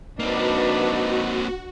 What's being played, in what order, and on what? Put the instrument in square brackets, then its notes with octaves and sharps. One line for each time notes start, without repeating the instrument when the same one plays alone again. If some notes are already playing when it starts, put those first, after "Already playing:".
[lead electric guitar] A#3 C4 [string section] D4 B4 [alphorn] D#4 [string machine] F#4